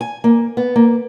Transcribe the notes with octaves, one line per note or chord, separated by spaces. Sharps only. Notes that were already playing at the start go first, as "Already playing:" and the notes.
G#5
A#3
B3
A#3